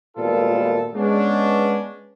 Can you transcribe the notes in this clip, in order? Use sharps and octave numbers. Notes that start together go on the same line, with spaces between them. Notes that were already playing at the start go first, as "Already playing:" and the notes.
G#1 A#2 G3 B3 F4 A4
G#3 B3 C#4 D4